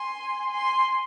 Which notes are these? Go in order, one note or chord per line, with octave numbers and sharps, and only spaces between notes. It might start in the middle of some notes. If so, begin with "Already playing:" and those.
Already playing: G#5 C6
G#5 C6